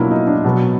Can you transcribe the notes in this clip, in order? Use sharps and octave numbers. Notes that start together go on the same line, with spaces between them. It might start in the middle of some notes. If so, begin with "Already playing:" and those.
Already playing: B2 F#3 A#3 D4 E4 F4
D#4
D4
B2 F#3 B3